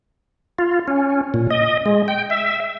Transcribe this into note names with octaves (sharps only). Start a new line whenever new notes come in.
F4
C#4
A#2
D#5
G#3
G5
E5